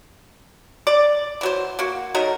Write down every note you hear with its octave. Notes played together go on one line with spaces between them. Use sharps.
D5
E3 F#3 C5
A#3 F#4
F#3 A3 D#4 A#4